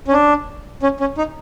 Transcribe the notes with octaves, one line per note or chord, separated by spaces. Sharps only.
C#4
D4
C#4
C#4
D#4